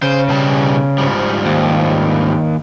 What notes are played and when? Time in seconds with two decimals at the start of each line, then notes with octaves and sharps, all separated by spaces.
0.02 C#3 C5
0.29 B2 G3 A5
0.98 G#2 F3 G3
1.46 D#2